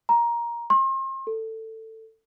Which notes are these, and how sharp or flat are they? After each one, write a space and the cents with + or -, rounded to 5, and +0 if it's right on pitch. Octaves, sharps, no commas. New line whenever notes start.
A#5 +15
C6 +40
A4 +15